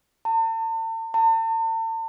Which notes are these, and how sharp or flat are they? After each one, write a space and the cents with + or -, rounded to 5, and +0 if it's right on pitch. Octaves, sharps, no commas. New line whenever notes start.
A5 +40
A5 +40